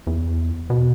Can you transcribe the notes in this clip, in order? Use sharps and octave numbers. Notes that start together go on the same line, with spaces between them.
E2
B2